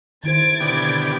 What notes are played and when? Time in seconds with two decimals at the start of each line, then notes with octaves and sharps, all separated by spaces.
0.24 D#3 E4 C5 G#6 A6 D7
0.60 B2 D3 G4